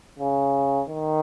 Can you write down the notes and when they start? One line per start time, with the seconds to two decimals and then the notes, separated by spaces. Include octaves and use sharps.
0.19 C#3
0.89 D#3